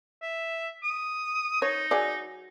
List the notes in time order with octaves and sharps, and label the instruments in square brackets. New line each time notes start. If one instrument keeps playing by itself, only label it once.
[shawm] E5
D#6
[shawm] D#4 [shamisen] C#5
[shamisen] F#3 G#4 D5